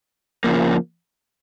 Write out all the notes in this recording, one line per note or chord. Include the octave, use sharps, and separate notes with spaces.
C#3 F3 A#3